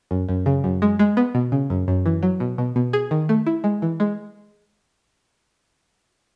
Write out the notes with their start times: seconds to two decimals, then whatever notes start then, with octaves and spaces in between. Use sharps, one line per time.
0.11 F#2
0.29 F#2
0.46 C#3
0.64 F#2
0.82 G#3
0.99 G#3
1.17 B3
1.35 B2
1.52 C#3
1.70 F#2
1.88 F#2
2.06 E3
2.23 F#3
2.40 B2
2.58 B2
2.76 B2
2.93 G#4
3.11 D#3
3.29 A3
3.46 E4
3.64 G#3
3.82 E3
4.00 G#3